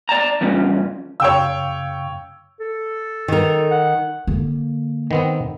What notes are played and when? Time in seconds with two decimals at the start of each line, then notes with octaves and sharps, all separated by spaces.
0.09 D5 A5 A#5
0.41 E2 G2 C#3 F3 C#4
1.20 F#2 C#3 C#5 F5 G5 E6
2.60 A4
3.28 D#3 A#4
3.71 F#5
4.27 D3 A#3
5.11 D#3 B3 C4